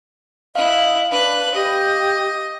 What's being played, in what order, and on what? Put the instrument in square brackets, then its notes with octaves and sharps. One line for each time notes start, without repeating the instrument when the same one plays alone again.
[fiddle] E4 F#6 [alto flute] D#5 [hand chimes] F5
[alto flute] D4 [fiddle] B4 F#6
[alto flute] G4 [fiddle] D#5